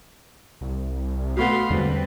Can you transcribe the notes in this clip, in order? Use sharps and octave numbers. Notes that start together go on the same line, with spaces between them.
C2
B2 A3 B3 F5 B5 C6
E2 D3 G3 G#3 C4 B4